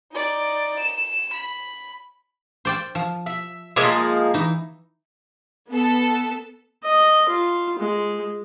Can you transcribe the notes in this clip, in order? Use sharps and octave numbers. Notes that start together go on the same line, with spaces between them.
D#4 D5
E7
B5
C5 D5 G5
F3
E5
F3 G#3 A#3 D5 E5 G#5
E3 D#4
B3 A4
D#5
F4
G#3